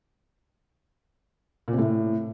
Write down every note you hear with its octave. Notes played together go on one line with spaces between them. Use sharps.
A#2
C3
A2